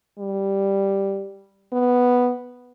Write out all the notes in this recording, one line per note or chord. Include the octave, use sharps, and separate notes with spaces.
G3
B3